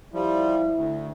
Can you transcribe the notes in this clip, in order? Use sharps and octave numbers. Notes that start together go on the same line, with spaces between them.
F3 G3 E4
D2